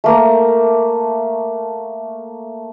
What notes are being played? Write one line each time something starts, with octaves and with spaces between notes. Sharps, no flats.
A3 A#3